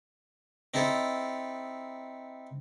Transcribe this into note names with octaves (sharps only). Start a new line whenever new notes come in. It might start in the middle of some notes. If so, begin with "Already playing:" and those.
C4 D#4 E4 A4